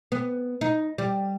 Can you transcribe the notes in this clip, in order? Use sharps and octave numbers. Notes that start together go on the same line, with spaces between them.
B3
D#4
G3